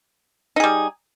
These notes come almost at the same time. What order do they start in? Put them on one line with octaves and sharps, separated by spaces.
D#4 G#4 G3